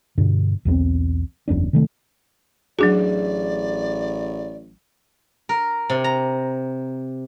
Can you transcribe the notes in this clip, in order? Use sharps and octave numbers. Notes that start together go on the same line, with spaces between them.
G2 B2 D3
B1 E2 E3 C4
F#1 E2 C#4 D4
C3 D#3 A3
A1 F#3 D4 F#4 G#4 D5
A#4
C3
A#5